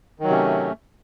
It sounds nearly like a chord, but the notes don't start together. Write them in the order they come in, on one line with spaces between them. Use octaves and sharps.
D#3 F#3 C3 C#4 A3